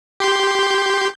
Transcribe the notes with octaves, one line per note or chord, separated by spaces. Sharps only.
G4 C6 G6